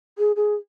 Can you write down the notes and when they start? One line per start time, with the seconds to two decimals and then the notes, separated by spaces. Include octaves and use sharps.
0.18 G#4
0.36 G#4